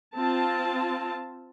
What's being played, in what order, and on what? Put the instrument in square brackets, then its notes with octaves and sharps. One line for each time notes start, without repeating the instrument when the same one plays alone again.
[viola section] C4 F4 A5